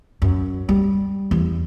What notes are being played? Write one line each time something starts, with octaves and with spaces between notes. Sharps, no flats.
F#2
G3
E2